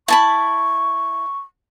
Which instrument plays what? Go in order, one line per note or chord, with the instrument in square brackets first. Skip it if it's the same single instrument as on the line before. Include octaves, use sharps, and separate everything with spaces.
[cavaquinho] E4 A5 B5 [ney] C#6